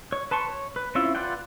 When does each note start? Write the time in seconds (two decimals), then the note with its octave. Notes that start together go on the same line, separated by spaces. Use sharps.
0.12 C#5
0.31 B4 A5 C6 C#6
0.48 C#5
0.76 B4
0.95 C4 C#4 E4 F4 E5
1.15 F4 B4 D5 F#5 G5